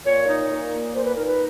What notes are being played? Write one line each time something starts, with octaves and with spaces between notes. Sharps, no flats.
A#2 C#5
D#4
A#2
A#3
A#2 C5
B4
D#4 A#4
B4